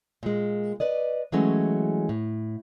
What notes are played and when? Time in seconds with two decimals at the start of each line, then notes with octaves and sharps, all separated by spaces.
0.23 A#2 G#3
0.80 B4 D5 D#5
1.32 E3 F#3 G#3 A3 C#4
2.09 A2